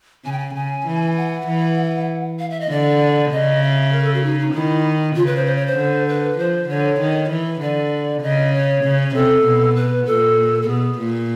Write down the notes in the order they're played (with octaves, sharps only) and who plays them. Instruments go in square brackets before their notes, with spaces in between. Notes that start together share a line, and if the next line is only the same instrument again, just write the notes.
[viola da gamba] C#3 [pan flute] G#5
[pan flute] G5
G#5
[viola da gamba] C#3 [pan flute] G#5
[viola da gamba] E3
[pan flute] F#5
[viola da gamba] E3
[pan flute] F5
E5
D#5
[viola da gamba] D3 [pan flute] D5
[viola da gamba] C#3 [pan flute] D#5
[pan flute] E5
A#4
A4
F#4
D#4
D#4
[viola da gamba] D#3 [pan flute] E4
[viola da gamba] C#3 [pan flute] F4
[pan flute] B4
C5
C5
C#5
C5
[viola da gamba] D3
[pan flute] B4
[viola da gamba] F3 [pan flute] C5
[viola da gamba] D3 [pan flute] C#5
[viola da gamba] D#3
E3
[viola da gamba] D3 [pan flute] D5
[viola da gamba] C#3 [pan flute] D#5
[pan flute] C#5
[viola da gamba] C#3
[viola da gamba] C3 [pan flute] A4
[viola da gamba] B2
[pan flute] B4
[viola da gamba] A#2 [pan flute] A4
[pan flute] A4
[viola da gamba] B2 [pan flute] G#4
[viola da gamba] A#2